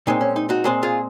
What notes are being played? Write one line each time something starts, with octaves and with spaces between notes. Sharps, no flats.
A#2 G#3 C4 D#4
C#4
D#4
D#4 F#4
A#2 G#3 C4
F4 G#4